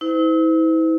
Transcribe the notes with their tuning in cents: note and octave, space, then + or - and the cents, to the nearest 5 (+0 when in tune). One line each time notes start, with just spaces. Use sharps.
E4 -40 C5 -45